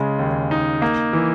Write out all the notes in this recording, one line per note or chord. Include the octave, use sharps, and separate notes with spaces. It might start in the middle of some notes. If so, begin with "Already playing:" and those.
Already playing: C#3 G#3
D#2
D#4
A#3
E3